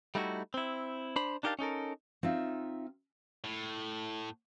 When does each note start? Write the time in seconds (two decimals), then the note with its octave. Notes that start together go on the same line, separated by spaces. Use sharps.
0.15 G3 A3 D#4 E4 F#4
0.54 C4 E4
1.16 D4 C5 B5
1.43 D4 D#4 G4 A#4 F5 A5
1.59 C#4 D#4 A4 A#4
2.23 C4 D#4 F4 E5
3.44 A2